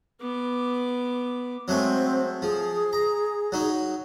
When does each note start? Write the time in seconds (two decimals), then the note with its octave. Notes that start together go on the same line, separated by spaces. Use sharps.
0.21 B3 D6
1.68 F#3 G#3 A3 C4
2.42 F3 G#4
2.93 A#5
3.52 F#3 D#4